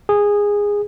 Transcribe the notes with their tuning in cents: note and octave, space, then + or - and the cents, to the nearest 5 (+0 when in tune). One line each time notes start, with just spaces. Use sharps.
G#4 -15